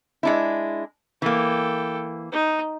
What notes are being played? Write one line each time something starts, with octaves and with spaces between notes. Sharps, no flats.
G#3 D4 E4
E3 A#3 A4 G5
D#4